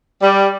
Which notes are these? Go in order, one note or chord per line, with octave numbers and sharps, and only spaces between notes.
G3